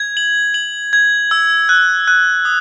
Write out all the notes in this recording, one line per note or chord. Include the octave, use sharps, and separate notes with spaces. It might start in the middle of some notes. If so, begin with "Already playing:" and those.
Already playing: G#6
F#7
F#7
G#6
E6
F#6
F#6
D#6